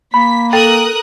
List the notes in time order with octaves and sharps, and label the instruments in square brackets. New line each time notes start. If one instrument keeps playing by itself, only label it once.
[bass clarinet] A#3 [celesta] B5 [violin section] B6
[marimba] A4 [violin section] A#4 D#6 F#6 [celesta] G5